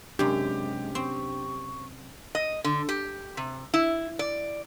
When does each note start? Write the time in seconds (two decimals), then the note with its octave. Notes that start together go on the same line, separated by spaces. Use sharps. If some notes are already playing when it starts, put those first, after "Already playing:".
0.19 F#2 C3 G#3 D4 G4
0.95 C4 C#6
2.35 D#5
2.64 D3
2.89 G4
3.37 C3
3.74 E4
4.19 D5